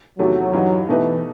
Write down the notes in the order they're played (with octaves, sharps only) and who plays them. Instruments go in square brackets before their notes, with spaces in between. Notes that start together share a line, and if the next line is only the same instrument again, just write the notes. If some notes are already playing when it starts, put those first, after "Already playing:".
[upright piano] E2 C3 D#3 A3 [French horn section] F#3
[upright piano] G2 E3 G3 D#4
[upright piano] B2 A3 D#4 G4 B4 [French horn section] E3